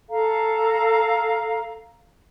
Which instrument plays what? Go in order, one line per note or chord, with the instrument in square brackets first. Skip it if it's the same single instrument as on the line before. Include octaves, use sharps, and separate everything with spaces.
[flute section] A4 F5 A#5